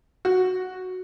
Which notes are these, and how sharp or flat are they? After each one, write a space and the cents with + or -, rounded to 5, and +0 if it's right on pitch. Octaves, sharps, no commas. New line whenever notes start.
F#4 -5